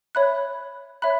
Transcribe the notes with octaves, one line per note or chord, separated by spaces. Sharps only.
C#5 E5 B5 F#6
C#5 E5 B5 F#6